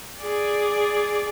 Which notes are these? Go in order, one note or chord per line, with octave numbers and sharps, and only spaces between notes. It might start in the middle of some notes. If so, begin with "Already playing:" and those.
G#4 D5